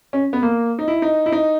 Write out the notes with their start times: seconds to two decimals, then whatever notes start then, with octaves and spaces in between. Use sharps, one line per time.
0.13 C#4
0.33 B3
0.42 A#3
0.79 D#4
0.88 E4
1.02 D#4
1.26 E4
1.32 D#4